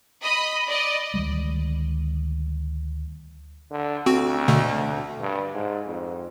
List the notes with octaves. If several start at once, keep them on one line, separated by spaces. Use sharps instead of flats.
D#5 B5 D#6
D5 D#5
D2 D#3 G3 G#3
D3
D2 C4 F#4
B2 D3 A3
G2
G#2
F2